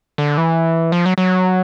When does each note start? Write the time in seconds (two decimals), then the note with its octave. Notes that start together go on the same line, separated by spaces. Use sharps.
0.18 D3
0.38 E3
0.92 F3
1.06 F#3
1.18 F#3